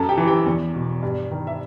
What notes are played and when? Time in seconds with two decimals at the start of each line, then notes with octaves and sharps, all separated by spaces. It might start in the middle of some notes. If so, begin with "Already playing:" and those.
Already playing: F#2 A4 A5
0.09 G4 G5
0.18 E3
0.27 G4 G5
0.46 E2
0.75 B2
1.03 G2
1.31 D#3
1.47 E5